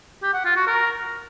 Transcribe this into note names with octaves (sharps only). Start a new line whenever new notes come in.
G4
F#5
F4
F#4
A#4